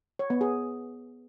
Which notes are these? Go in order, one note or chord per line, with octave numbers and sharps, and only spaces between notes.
C#5
B3
G#4